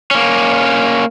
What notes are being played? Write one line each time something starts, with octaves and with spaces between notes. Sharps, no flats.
A#3 C#4